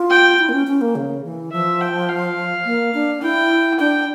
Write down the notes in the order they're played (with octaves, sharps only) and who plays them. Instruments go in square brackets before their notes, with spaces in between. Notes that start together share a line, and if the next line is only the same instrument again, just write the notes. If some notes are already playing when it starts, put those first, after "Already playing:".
Already playing: [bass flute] F4
[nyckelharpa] G5
[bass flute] E4
A#3
C#4
C#4
A#3
C#3
E3
[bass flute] F3 [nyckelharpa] E5
[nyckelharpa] G5
F5
[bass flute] A#3
D4
[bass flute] E4 [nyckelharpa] G5
[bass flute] D4 [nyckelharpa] G5